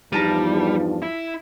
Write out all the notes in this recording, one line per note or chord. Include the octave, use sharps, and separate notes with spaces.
E2 G2 F3 G3 D#4 F4 A5 A#5
E4